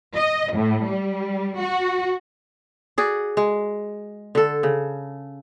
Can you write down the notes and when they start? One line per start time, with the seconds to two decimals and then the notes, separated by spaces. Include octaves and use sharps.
0.17 D#5
0.54 A2
0.87 G3
1.60 F#4
2.98 F#4 G#4 D5
3.37 G#3
4.35 D3 A4
4.63 C#3